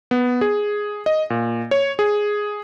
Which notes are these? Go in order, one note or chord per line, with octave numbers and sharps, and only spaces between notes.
B3
G#4
D#5
A#2
C#5
G#4